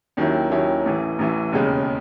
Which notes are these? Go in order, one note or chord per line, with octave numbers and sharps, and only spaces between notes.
D#2 D#3 F#3 C#4 E4
D#2 D#3 F#3 C#4 E4
A1 A2 E3
A1 A2 E3
E1 D#2 C#3 G#3